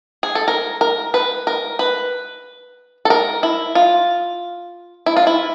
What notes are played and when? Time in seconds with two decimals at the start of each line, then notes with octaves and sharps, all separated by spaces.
0.23 G#4
0.35 A4
0.48 A#4
0.81 A#4
1.14 B4
1.47 A#4
1.79 B4
3.05 A4
3.10 A#4
3.43 E4
3.75 F4
5.06 E4
5.16 F4
5.27 E4